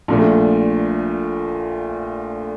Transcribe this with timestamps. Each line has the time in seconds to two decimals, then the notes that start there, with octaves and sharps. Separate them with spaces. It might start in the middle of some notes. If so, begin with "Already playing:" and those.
0.08 A#1 A#2 A3